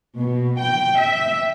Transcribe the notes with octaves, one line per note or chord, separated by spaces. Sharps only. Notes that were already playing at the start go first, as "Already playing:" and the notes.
B2
G5
E5